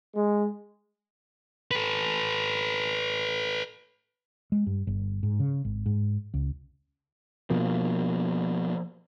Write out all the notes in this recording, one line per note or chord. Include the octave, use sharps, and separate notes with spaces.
G#3
A4 B4
G#3
G2
G1
G#2
C#3
G#1
G#2
C#2
B2 F3 A#3